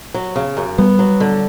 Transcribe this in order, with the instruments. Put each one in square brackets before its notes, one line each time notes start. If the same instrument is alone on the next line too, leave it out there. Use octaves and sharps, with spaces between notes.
[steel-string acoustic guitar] F#3
C#3
F#2
[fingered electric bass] G3 [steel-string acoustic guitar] B3
[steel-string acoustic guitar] F#3
D3